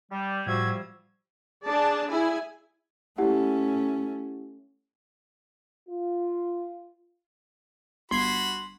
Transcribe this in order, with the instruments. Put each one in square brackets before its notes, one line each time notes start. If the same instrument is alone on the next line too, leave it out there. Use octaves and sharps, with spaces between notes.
[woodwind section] G3
[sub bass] A2 [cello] F3 G3 [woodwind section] F#4 E5 [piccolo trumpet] G#6
[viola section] D4 G#4 D5 A5
E4 G#4 G#5
[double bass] A3 C#4 [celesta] E4 G4 F#5
[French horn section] F4
[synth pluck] G1 G#6 C7 [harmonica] F#4 B5 [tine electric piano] C6